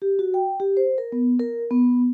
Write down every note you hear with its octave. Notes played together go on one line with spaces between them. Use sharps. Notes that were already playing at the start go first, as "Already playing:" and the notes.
G4
F#4
G5
G4
C5
A#4
B3
A#4
B3